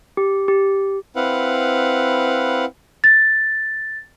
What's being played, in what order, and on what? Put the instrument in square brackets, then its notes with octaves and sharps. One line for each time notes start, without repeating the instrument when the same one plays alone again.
[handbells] G4
G4
[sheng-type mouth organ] C4 E4 B4 F5 F#5
[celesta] A6